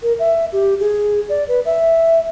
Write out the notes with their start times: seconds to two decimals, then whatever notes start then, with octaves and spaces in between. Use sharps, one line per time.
0.03 A#4
0.19 E5
0.53 G4
0.80 G#4
1.29 D5
1.48 B4
1.66 E5